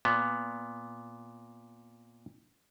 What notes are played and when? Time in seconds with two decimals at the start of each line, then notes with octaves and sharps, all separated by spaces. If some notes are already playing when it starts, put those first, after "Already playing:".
0.05 A#2 B3